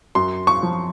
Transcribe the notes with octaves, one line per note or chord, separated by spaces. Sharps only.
F#2 C6
C#6
F3